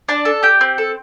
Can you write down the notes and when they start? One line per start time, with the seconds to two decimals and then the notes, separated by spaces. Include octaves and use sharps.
0.09 D4 A5
0.25 A4
0.43 G4 G5
0.61 C4
0.78 A4